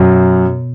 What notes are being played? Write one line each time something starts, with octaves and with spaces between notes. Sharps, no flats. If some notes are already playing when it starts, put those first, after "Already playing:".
Already playing: F#2 B2